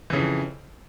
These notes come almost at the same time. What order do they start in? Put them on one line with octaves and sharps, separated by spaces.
E3 C#3 F2